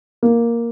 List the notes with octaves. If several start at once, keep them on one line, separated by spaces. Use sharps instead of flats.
A#3